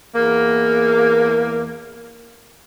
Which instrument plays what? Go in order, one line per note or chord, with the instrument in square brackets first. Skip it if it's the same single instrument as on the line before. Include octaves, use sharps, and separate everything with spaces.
[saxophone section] E2 A#3